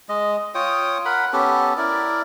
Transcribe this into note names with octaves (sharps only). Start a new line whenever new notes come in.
G#3 D#5
F4 C#5 G5 D#6
A#4 F#5 B5
B3 C#4 G4 A4
E4 A#4 D5